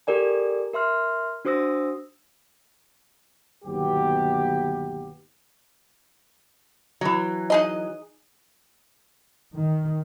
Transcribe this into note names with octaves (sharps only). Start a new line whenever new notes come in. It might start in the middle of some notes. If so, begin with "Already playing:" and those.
G4 A4 A#4 D5 G#5
A#4 E5 C6 F6
D4 F#4 C5 D#6 E6 A#6
G1 D#2 B2 F#3 B3 G4
E3 F#3
D#4 G#4 D#5
D#3